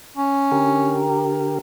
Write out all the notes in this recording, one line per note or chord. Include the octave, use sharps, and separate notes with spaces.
C#4
D3 G4 A#4